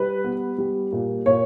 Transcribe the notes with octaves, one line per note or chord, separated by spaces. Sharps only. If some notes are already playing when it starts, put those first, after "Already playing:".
Already playing: G3 B4
B3
G3
A#2
A#2 C#5